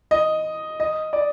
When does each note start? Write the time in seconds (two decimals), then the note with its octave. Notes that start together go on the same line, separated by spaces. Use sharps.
0.11 D#5
0.80 D#5
1.13 D5